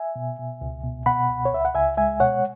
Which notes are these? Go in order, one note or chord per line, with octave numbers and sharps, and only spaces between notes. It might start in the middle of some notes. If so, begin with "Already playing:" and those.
Already playing: E5 G#5
B2
B2
C#2
B2
B2 F#5 B5
C#2
C#5
C#2 E5
F#5
C#2 E5 G#5
G#3 E5 G#5
B2 C#5 F#5